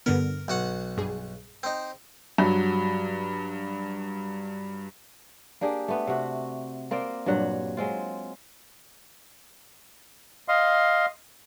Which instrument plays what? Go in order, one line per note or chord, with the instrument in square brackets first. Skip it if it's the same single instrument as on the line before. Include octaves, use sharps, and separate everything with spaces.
[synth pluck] G2 D3 B3 [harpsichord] A#4
[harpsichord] B1 F#4 F#5
[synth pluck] G2 G#4
[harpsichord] C4 D#4
[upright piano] G2 F#3
[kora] A#3 D4 G4 G#4
A3 B3
C3 F#4
A#3 C4 A#4 D5
G2 A#2 F#3 F#5
F#3 G#3 C4 F4
[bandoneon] D#5 F5 C6